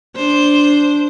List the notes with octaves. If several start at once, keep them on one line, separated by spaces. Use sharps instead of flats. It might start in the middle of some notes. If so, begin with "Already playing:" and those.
D4 C5